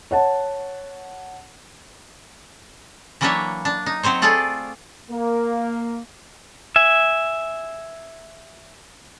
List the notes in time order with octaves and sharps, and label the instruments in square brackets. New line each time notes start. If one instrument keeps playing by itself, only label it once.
[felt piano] C#5 F#5 A5
[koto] E3 F#3 A#3 D4 C#5 E5
D4
D#4
F#3 C4 C5 C#5
A3 F4 G#4 A4 D5
[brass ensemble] A#3
[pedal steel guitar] E5 G#5